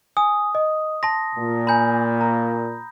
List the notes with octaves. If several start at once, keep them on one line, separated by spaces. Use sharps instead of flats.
G#5 D#6
D#5
A5 C6 A#6
A#2
G#5 A#5 B5 G6
A#5